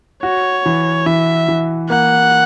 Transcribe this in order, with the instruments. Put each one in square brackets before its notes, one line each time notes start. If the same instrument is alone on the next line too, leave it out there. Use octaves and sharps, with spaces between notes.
[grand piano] F#4 [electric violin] C#5
[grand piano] E3
[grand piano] E3 [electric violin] E5
[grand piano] E3
[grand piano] A#3 [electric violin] F#5